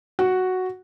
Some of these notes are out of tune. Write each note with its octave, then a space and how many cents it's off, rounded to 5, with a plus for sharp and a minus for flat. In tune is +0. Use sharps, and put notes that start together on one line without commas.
F#4 +0 F#5 +0